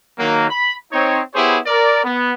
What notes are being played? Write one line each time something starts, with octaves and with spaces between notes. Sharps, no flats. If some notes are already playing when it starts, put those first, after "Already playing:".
D#3 F#3 A#3
B5
C4 D#4 C#5
B3 E4 G4 G#4 C5 C#5
A#4 D5
B3